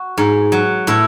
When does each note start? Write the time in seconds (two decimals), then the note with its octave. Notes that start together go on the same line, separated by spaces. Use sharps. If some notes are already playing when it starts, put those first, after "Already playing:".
Already playing: F#4
0.18 G#2
0.52 F#3
0.87 A2 E4